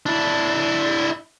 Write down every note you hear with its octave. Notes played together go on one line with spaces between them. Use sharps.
D4 E4